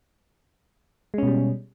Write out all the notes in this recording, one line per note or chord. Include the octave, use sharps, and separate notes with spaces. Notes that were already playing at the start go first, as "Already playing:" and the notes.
B2 G3 G#3 C#4